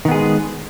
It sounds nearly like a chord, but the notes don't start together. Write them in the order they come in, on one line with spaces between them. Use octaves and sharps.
D#3 B3 G#4 G#3